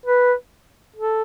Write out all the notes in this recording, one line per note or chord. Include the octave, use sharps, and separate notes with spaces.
B4
A4